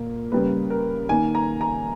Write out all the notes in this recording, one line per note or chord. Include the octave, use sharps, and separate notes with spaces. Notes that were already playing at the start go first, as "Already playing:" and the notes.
Already playing: A#2 A#3
C#3 G3 A#3 B4
A#4
D#3 A#3 G#5
A#5
A#5